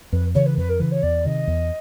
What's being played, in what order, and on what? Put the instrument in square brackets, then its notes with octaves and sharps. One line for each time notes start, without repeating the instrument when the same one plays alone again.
[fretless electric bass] F2 [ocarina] B4
[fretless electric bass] C#3 E3 [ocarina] C#5
[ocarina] B4
[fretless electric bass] F2 [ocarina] B4
[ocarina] A#4
[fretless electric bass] C#3 E3 [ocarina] B4
[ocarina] C#5
[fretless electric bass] E2 [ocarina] D5
[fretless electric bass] C3 D#3 [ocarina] D#5
[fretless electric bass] E2